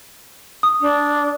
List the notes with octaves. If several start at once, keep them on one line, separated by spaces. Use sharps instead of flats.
D#6
D4